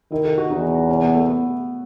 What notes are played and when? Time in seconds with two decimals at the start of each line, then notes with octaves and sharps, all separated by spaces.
0.12 D#3 E4
0.25 A4
0.38 F#4
0.50 E2 D#4
0.89 C#4
1.02 B3
1.15 A3
1.28 B3